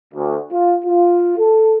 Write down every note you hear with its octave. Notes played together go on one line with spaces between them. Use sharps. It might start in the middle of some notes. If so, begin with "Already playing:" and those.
D2
F4
F4
A4